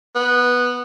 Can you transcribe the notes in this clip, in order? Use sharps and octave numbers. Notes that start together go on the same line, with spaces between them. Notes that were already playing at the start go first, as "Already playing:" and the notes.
B3